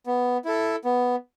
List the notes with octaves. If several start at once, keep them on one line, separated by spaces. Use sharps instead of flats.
B3
E4 A4
B3